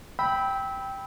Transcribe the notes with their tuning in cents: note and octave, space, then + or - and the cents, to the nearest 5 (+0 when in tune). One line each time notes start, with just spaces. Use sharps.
G5 +0 B5 +0 E6 -25